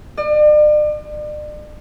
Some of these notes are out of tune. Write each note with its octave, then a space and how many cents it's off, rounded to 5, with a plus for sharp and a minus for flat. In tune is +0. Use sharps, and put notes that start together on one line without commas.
D5 +40